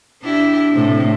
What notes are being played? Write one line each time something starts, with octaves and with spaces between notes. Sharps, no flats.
D4 E4 G4
A2 C3